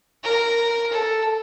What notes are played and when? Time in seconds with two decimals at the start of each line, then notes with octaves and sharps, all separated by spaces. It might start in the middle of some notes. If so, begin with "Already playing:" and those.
0.23 A#4
0.92 A4